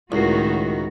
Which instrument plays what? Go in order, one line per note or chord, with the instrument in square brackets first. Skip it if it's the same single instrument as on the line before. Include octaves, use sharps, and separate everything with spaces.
[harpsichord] C#2 [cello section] A2 D#3 F#4 [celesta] E4 A#4 C7